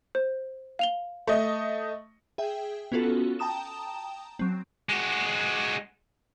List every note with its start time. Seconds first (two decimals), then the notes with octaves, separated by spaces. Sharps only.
0.15 C5
0.79 F5 F7 G7
1.27 A3 D#5
2.38 G#4 E5 G5
2.92 B3 C#4 F4 F#4 A4
3.39 G5 A5 A#5 D#6 E7
4.39 F#3 C4
4.89 G#3 F#4